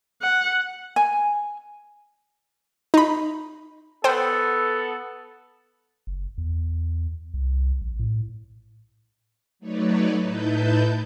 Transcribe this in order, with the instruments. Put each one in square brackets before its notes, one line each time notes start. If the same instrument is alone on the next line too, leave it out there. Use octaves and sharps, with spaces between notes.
[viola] F#5
[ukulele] G#5
[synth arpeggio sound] D#4 B5
[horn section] B3 A4 [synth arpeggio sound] C5 G5
[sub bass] F#1
E2
C2
A#1
A2
[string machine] F#3 A3 D#4 B4 C#5 D5
A2 D#4 E4 B4 A5 G6